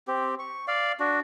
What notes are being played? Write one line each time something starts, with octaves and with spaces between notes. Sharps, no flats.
C4 G4
C#6
D5 F5
D4 F#4